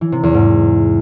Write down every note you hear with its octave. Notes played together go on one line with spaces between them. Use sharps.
E3
C3
E2
G#2